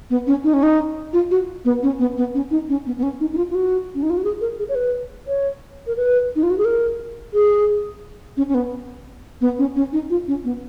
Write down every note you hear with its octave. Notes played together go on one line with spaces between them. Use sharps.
B3
C#4
D#4
C#4
D#4
F4
F#4
B3
C#4
B3
B3
C#4
D#4
C#4
B3
B3
C#4
D#4
D#4
F4
F4
F#4
C#4
D#4
F4
F#4
G#4
A#4
G#4
C#5
B4
C#5
A#4
B4
D#4
F4
F#4
G#4
A#4
G#4
C#4
C#4
B3
B3
C#4
C#4
D#4
F4
C#4
B3